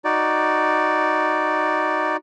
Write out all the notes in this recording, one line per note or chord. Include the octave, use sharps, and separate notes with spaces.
D#4 F#4 D5